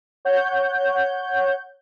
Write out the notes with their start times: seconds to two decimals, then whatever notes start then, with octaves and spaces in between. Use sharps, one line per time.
0.25 C#5 F#5 G6